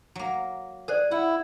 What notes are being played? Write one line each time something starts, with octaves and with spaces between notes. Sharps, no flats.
F#3 A#3
G#4 A#4 C5 D5
E4 F#5